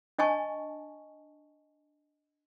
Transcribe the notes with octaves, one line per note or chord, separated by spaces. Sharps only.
D4 D#5 G#5 A5 C#6